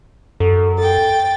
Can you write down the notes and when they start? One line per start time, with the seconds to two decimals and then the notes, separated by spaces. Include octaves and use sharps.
0.40 F#2 A4
0.78 A4 G5 A6